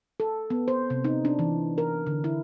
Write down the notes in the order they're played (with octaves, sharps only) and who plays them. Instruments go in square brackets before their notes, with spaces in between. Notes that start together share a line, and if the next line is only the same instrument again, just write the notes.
[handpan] A4
B3
C5
C3
D#4
D4
E3
A#4
D3
E4